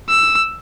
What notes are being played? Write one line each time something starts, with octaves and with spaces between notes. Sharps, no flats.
E6